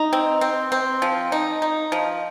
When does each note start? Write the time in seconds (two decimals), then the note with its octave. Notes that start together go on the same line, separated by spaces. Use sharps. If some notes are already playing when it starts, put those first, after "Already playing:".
Already playing: D#4
0.13 C4
0.41 C4
0.72 C4
1.02 F3
1.32 D#4
1.62 D#4
1.92 F3